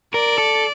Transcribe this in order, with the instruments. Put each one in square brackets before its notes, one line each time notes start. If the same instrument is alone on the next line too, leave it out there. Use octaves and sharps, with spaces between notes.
[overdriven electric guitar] A#4 [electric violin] D5
[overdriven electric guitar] A4